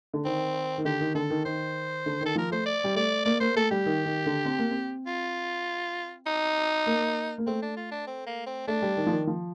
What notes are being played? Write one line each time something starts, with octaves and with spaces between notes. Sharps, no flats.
D3
D#3 C4
D#3
D3 G4
D#3
D3 A4
D#3
D#3 C5
D3
D#3 A4
F3 A#4
A3 C5
D5
G3
A3 D5
A#3 D5
A#3 C5
A3 A4
G3 G4
D#3
D#3
D3
C4
A#3
C4
F4
D#4
A#3
A#3
A3 C4
D4
F4
D4
C4
A#3
C4
A3 D4
G3
D#3
F3
D#3
F3